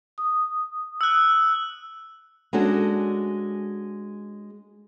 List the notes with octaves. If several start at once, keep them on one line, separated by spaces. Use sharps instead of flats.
D#6
E6 F#6
G#3 C#4 D4 F#4 A4